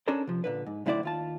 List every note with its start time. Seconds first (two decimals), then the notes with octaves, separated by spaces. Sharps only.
0.08 C#4 D4 A4 A#4 C5 D5
0.27 C3 F3
0.44 A#2 D3 B4
0.66 G#2
0.86 B1 A2 D3 E4 C5 D5
1.03 D#2 F4 A5